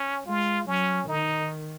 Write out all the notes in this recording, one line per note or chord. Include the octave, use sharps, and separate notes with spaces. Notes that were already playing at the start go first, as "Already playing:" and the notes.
Already playing: C#4
G#3 F4
F#3 C#4
D#3 D#4